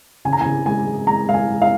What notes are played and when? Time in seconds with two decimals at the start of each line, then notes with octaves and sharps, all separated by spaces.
0.25 C#3 G#5
0.33 A#5
0.41 G#5
0.46 C#3
0.66 G#3 G#5
0.86 G#3
1.07 G#3 A#5
1.28 G#3 F5
1.34 G#5
1.48 G#3
1.62 F5